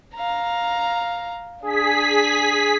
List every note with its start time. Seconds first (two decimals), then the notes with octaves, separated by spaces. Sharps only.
0.15 F5 A#5
1.62 D4 G#4 B6